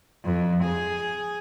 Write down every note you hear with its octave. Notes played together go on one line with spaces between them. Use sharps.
F2
G#4